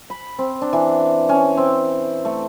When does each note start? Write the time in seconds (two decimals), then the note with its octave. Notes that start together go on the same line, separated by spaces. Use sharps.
0.10 B5
0.39 C4
0.61 D4
0.73 E3
1.29 C#4
1.57 C4
2.25 A3